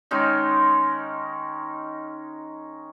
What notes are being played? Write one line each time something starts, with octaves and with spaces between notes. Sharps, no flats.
D#3 G#3 C#4 D#4